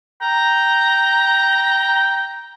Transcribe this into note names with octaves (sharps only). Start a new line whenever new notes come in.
G5 A#5